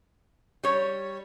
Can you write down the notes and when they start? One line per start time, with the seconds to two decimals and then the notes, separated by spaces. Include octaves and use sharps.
0.63 G3 C#5